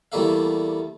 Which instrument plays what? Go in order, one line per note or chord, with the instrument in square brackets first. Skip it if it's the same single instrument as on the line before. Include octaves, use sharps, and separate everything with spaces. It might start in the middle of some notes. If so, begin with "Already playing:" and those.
[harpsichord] E2 G3 A3 A#3 E5 F5